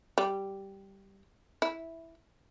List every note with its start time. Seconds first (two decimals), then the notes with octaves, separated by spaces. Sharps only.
0.18 G3
1.62 E4